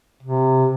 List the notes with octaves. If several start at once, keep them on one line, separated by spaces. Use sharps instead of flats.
C3